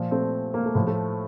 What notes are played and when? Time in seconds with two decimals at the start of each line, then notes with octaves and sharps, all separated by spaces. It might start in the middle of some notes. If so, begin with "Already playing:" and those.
Already playing: A#2 F3
0.11 A3 C4
0.54 A#3
0.65 A3
0.75 A2 F3
0.87 A3